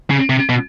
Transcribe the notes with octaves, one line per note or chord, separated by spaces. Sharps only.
C#3
C3
B2